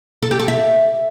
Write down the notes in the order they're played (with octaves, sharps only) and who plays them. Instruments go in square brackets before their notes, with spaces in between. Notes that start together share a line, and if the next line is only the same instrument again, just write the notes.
[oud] A4
G4
A4
E5